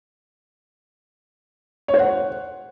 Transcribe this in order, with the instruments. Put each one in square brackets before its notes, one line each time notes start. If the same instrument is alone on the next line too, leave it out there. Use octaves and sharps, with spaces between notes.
[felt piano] C#5
C5
F#5